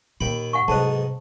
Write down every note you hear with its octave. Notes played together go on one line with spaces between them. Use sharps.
D#2 A#2 G5 B5
F#5 G#5 C#6
B1 G#2 C3 C5 D#5 A5